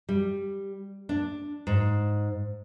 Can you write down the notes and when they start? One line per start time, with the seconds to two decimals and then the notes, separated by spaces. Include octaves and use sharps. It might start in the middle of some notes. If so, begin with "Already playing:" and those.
0.09 G3
1.09 D4
1.67 G#2